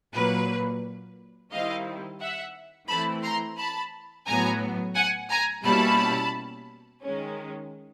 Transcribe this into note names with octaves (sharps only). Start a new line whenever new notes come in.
A#2 F#3 A#3 B4
D#3 G3 C4 E4 D#5 F5
E5 F#5
E3 A3 C4 E4 A5 B5
A#5 C6
A5 B5
A2 F#3 B3 G#5 A#5
F#5 G#5
G#5 A#5
B2 G3 A#3 C#4 E4 A5 B5
D#3 G#3 C#4